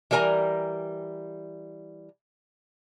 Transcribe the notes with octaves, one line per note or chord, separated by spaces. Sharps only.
E3 G3 A#4 G#5 A#5